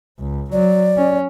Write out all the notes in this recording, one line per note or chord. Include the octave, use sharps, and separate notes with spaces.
C#2
F#3 D5
C#4